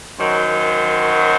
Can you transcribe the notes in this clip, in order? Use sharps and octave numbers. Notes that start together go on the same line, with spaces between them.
F#2 D#3 F#3 C5